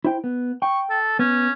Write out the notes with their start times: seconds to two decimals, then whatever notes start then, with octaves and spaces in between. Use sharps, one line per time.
0.04 E4 C5 G5
0.24 B3
0.62 G5 C#6
0.90 A4
1.19 B3 C#4